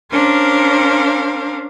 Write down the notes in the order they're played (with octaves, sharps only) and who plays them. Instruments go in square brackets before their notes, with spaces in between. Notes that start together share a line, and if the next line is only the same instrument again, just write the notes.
[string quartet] C#4 D4 A#4 C5 F5